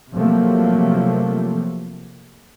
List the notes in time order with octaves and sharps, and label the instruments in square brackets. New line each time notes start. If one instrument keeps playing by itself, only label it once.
[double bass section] C3 F3 F#3 A3 A#3